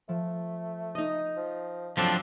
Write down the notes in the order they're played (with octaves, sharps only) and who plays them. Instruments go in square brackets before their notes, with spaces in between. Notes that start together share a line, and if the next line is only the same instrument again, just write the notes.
[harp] F3 [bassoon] A3
[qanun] D#4 D#5 [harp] D#6
[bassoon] F3
[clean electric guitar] F3 C4 D4 [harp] F#3 F#4 [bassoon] A4